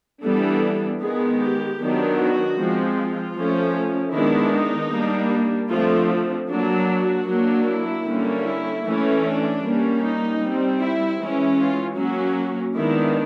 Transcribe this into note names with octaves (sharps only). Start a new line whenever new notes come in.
E3 G3 B3 D4 A4
D#3 G#3 B3 G#4
G4
D#3 F#3 B3 D4
F#4
F3 G#3 C4
F4
F3 A3 C#4
D#3 G#3 B3 D4 E4
D#4
G3 A#3 D4
D3 F3 A3 C4 F4
F#3 A#3 D4
F#4
F#3 A#3 D4
E4
D3 G3 A#3 C#4
E4
E3 A3 C#4
D4
G3 A#3 C#4
D#4
G3 C4
E4
E3 G#3 C#4
F4
F#3 A#3 C#4 F#4
D#3 G#3 B3 D4 E4